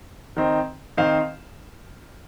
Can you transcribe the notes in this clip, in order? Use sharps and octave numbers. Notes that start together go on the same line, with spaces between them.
D#3 C4 D#4
D#3 C4 D#4 C5 F5